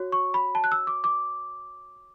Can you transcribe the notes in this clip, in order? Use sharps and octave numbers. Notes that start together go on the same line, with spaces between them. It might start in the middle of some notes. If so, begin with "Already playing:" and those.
Already playing: F#4 C#5
C#6
B5
A5
F#6
E6
D6
D6